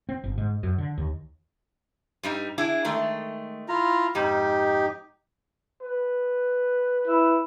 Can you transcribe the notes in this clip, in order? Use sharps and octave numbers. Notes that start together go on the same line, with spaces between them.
C4
G1
G#2
F#2
D3
D#2
G2 G3 D#4
D4 E4 G#4
D#3 G#3 A3
E4 F4 A#5
F2 G#2 D#4 G4
B4
E4